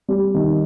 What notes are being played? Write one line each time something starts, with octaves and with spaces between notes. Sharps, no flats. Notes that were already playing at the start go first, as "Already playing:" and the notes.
G3
D#3